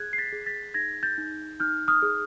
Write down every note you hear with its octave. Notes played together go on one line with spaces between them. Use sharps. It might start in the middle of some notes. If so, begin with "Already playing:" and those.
Already playing: G#4 F#6 G#6
C7
A6 B6
G#4
A6 B6
D#4 G#6 A#6
G6 A6
D#4
D#4 F6 G6
D#6 F6
G#4